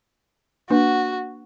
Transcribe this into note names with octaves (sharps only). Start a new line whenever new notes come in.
A#3 D4 F#4 B4